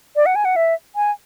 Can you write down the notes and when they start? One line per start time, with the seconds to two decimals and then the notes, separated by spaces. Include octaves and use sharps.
0.16 D5
0.26 F#5
0.35 G#5
0.45 F#5
0.56 E5
0.96 G#5